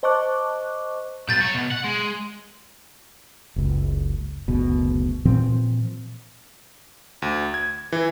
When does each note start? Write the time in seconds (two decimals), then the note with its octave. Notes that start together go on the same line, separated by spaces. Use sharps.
0.03 C5 D#5 A5 C#6 D6 F#6
1.29 B1 F#3 G6 A6
1.41 F#4 C#5
1.54 B2
1.71 F#5
1.84 G#3
3.56 F#1 C#2
4.48 F#1 D2 B2
5.25 A#2 E3 F3 C4
7.22 D2
7.54 G#6
7.92 E3